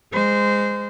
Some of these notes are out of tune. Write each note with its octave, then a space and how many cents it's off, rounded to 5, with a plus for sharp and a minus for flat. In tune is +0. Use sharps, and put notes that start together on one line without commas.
G#3 -15 C5 -20